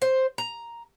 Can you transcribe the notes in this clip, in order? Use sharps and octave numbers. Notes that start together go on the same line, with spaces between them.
C5
A#5